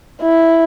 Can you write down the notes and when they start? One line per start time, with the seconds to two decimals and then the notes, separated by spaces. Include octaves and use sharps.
0.22 E4